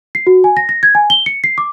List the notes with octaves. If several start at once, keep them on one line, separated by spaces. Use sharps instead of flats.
C7
F#4
G#5
A#6
A#6
G#6
G#5
G7
C#7
C7
D6